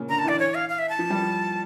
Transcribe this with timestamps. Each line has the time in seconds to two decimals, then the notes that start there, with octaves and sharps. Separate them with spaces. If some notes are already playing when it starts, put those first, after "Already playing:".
Already playing: A#2 C#3
0.09 D3 A#5
0.19 A5
0.24 E3 D5
0.39 C#5
0.55 F5
0.69 F5
0.79 E5
0.89 A5
0.99 F3
1.10 G3
1.22 F3